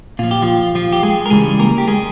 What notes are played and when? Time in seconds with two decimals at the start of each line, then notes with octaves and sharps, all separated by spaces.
0.19 A#2 F3 F4
0.31 G4
0.42 F3 F4
0.75 F3 F4
0.93 G4
1.03 G#3 G#4
1.26 A#4
1.30 C#3 E3 G3 G#3 G#4
1.59 A#3 A#4
1.78 G4
1.87 G#3 G#4